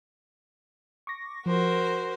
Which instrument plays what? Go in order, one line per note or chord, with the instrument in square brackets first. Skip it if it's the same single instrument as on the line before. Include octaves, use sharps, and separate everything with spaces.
[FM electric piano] C#6 D6 A#6
[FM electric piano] F3 [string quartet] F#4 A#4 C5